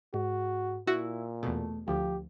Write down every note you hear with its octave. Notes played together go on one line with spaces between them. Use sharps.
G#2 F#4
A#2 E4 F#4
E2 B2 A3
D2 F3 G4